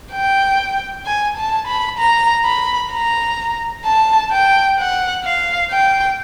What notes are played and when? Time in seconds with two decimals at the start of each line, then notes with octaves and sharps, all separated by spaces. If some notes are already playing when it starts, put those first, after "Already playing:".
0.12 G5
1.06 G#5
1.37 A5
1.67 B5
1.98 A#5
2.45 B5
2.92 A#5
3.85 A5
4.31 G5
4.79 F#5
5.24 F5
5.71 G5